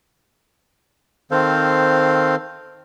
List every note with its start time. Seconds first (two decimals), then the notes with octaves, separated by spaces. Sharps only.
1.31 D#3 C4 A4 C5 F5